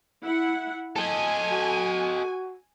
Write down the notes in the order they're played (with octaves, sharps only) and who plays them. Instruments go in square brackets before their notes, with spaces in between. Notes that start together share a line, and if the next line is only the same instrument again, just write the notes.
[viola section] E4 F#5
[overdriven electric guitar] A4 D#5 [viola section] G#5
[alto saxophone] F#4